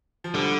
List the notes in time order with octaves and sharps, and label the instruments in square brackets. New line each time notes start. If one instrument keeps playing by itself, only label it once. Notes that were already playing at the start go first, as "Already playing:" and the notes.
[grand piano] F3
[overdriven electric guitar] D3 [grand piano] G3